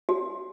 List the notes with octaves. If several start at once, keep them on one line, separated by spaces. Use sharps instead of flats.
F#4